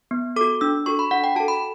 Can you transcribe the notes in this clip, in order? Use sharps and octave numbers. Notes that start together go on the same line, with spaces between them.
B3
F#4 A4 D6
D4 E6
F#4 A4 C#6
B5
D4 F#5
G5
F#4 A4 A5
B5